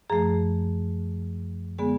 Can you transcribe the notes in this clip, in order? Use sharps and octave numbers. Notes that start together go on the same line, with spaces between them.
F#2 F3 A3 G#4
D3 G#3 B3 G#4